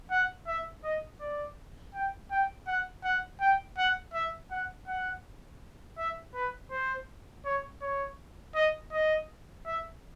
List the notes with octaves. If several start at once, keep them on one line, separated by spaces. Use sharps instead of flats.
F#5
E5
D#5
D5
G5
G5
F#5
F#5
G5
F#5
E5
F#5
F#5
E5
B4
C5
C#5
C#5
D#5
D#5
E5